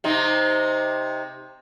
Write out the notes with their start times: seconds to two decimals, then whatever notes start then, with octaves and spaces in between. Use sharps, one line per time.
0.04 C3 C4 D#4